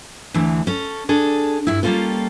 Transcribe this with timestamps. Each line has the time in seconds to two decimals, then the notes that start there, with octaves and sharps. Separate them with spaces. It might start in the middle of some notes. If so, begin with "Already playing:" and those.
0.34 D2 D3 E3
0.67 C#4 A4
1.09 D4 G#4 A4
1.67 G2 E4
1.83 G3 A#3 B3 C#4 F4 A4